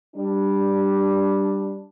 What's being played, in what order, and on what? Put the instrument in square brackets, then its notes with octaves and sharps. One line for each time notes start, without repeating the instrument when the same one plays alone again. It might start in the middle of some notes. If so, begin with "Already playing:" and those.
[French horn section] G3 D4